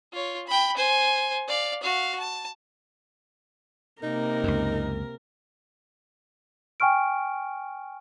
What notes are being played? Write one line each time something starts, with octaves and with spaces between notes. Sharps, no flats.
F4 C#5
G5 B5
C5 G#5
D5 F5
F#4 F5
A5
C3 A#3 D#4 A#4
C#2 F#2
G5 G#5 C#6 F6 D7